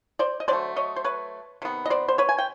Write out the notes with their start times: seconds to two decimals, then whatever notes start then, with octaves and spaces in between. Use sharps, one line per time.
0.19 C5 D5
0.40 D#5
0.48 D3 C5 D5
0.51 F#3 A3
0.76 C#5 D#5
0.96 C5
1.04 B4 C#5
1.62 C3 D#3 B3
1.86 D#5
1.90 C5 D5
2.08 C5
2.18 B4 C#5
2.29 G#5
2.38 G5